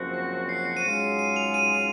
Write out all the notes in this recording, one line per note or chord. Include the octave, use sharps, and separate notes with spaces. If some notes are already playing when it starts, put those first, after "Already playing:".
Already playing: F#1 F#2 F3 C4 F#4
A#6
C7
C#7
C7
D#7
G#2 F#3 C#4 F4 G#4 C#7
D#7
F7
D#7